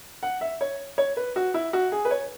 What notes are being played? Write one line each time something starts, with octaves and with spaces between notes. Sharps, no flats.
F#5
E5
C#5
C#5
B4
F#4
E4
F#4
G#4
B4
C#5